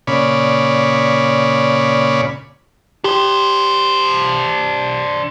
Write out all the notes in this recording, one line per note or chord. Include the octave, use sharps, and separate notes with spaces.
A#2 C#3 C#5 D5 B5
D4 G4 C5